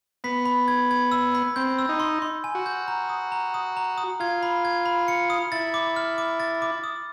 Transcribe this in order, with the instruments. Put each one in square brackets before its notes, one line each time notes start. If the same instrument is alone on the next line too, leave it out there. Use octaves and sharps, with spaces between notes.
[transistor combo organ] B3 [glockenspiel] B6
[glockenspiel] B5
G#6
G#6
E6
B5
[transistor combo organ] C4 [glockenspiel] G6
[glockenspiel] E6
[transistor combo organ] D#4
[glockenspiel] C6
C6
G#5
[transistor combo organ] F#4
[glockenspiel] G6
A#5
D#6
A#5
D#6
A#5
D#6
[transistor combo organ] F4 [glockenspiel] G#6
[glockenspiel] B5
G#6
B5
C#7
D#6
[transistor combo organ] E4 [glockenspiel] A6
[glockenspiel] D6
F6
D6
A6
D6
D#6